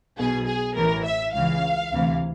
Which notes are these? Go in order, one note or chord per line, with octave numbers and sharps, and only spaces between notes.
B1 B2 G#4
G#4
A1 A2 E3 A#4
E5
C#2 C#3 E3 F5
D2 C3 E3